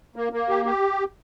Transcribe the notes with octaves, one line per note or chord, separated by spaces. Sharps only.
A#3
A#3
G4
G4